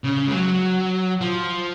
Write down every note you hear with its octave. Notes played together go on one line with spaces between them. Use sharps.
C#3
G#3
F#3
F3